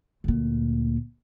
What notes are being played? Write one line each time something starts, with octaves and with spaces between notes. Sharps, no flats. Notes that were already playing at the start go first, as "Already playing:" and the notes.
D2 A#2